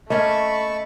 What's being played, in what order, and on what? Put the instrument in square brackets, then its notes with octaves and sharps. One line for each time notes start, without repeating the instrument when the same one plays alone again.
[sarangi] A3 [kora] A#3 C#4 [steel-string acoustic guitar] D#5 [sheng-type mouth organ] A5 B5 C#6